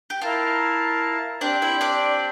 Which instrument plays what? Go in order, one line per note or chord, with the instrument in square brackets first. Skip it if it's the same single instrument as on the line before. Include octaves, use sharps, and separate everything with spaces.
[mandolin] G4
[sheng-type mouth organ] E4 A#4 F5 A5 [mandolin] F4
[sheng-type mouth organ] C4 G4 C5 G5 [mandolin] D4 D5
[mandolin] E4 E5
D4 D5